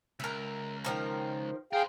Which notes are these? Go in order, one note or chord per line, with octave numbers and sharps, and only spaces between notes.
C#2 A#4 E5
D#3 F3 A#4
G#4 A#4 C5 F5 G5